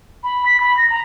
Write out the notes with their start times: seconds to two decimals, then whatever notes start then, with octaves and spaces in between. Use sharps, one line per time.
0.24 B5
0.46 B6
0.60 B5
0.77 A#6
0.90 A#5